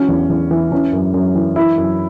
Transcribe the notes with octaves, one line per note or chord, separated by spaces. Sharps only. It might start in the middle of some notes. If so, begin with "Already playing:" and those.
Already playing: E3 C#4 F#4
E2
E2
E3
E3 C#4
F#2
F#2
E3
E3 E4
F#2